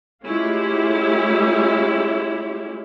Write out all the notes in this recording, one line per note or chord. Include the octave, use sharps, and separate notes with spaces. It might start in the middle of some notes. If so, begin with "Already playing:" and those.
G#3 A3 C#4 E4 F4 G4